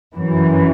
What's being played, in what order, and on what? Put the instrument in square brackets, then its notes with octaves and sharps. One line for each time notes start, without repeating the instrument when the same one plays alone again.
[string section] F#2 E3